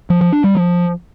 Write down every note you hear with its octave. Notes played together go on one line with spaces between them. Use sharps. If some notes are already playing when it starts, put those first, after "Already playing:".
F3
F3
D4
G3
F3